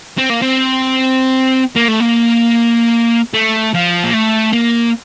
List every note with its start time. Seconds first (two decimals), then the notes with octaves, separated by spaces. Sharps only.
0.18 C4
0.30 A#3
0.42 C4
1.76 A#3
1.88 A3
2.00 A#3
3.34 A3
3.74 F3
4.04 A#3
4.14 A3
4.53 A#3